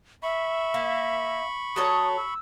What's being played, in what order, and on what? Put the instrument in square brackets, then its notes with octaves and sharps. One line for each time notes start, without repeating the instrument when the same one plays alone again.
[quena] E5 [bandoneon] B5 C#6
[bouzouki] A#3
[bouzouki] F#3 A4 C#5 [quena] D#6
[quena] E6